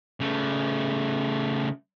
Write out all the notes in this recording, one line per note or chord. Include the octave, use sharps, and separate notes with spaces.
C#3 A3